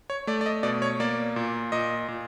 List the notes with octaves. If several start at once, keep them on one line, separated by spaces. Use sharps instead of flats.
C#5
A3 D5
D5
D#5
B2 D5
C#5
A#3 D5
A#2
A#2 D#5
A#2